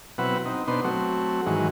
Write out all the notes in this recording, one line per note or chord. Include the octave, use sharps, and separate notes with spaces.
B2 F#3 C4 E4 B4 F#5
C4 D#4
B2 B3 D4 D#4 C5 C6
F#3 A3 C4 F#4
G#2 D#3 E3 F#3 G#3 F#4